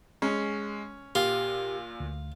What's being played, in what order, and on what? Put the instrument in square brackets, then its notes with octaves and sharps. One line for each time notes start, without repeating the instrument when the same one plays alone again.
[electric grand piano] G#3 [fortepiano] C#4
[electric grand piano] A#2 [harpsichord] F4 [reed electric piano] G4
[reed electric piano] D2